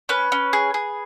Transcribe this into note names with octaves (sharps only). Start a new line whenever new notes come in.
C#4 B4
C#4
G#4
G#4